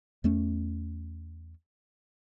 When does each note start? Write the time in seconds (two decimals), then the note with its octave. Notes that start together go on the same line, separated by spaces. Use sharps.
0.24 E2 A3 C#4